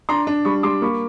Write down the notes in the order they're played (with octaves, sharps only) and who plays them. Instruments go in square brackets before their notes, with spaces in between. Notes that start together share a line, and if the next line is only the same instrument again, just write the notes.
[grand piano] D4 [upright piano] A#5 C6
[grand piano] D4
[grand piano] G3 [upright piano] B5 C#6
[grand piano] G3 [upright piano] C6 D6
[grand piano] A#3 [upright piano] B5 C#6